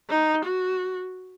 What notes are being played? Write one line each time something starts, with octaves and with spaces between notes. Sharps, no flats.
D#4
F#4